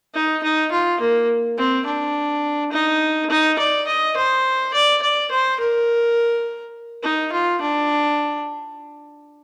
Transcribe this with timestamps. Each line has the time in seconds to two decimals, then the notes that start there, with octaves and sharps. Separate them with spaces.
0.14 D#4
0.43 D#4
0.72 F4
1.00 A#3
1.58 C4
1.86 D4
2.72 D#4
3.30 D#4
3.59 D5
3.87 D#5
4.16 C5
4.74 D5
5.02 D5
5.31 C5
5.60 A#4
7.03 D#4
7.32 F4
7.61 D4